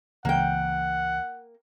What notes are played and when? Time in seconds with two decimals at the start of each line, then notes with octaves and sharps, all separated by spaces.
0.25 C#2 C#3 E3 A#3 F#5 G5